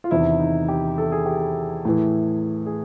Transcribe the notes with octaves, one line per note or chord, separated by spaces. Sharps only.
F4
E2 C3 D#3 E4
D#4
G4
A4
G#4
G4
G#4
A2 E3
G#4